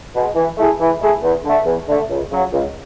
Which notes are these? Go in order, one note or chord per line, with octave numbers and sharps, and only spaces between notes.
B2 G#3
E3
A3 E4 G#4
E3
A3 E4 G#4
E2
D3 A3
E2
D3 A3
C#2
C#3 F#3
C#2